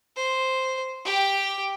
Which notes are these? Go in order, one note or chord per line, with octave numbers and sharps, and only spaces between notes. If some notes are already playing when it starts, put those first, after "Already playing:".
C5
G4 G5